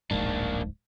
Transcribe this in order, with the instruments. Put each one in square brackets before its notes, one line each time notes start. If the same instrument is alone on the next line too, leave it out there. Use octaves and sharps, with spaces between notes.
[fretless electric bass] D1 A#1 G#2 [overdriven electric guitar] A#3 D4